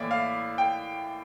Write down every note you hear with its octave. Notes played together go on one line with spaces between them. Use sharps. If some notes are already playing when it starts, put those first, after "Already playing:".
Already playing: A2 E3 A#3 E4 D5 E5
F5
G5